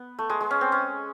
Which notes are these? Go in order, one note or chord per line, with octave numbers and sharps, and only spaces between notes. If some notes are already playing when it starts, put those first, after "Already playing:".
Already playing: B3
A3
G#3
G#3
C#4
C4
C#4